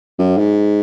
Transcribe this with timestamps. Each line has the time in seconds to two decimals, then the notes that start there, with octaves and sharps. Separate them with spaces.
0.19 F#2
0.38 G#2